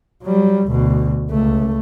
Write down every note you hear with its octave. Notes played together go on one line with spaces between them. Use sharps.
F#3 G3
D2 B2
C#2 A3